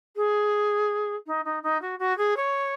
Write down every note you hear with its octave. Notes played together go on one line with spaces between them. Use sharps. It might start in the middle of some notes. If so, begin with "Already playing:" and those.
G#4
D#4
D#4
D#4
F#4
F#4
G#4
C#5